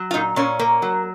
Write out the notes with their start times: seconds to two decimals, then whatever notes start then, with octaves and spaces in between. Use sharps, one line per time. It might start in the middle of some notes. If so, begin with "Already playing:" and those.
Already playing: F#3
0.11 F4
0.14 A#2 D#4
0.36 A#2 C#4
0.59 A#3
0.82 F#3